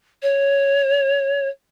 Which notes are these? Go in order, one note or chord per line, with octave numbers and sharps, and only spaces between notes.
C#5